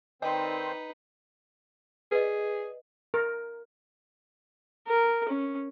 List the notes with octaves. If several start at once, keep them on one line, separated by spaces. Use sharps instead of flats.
D#3 C4 D#4 B4 C5 D5 D#5 G5
G#4 B4 D5 D#5
A#4
A#4
C#4